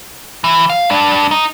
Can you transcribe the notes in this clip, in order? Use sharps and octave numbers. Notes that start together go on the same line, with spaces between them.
E3
F5
G2 D4
D#4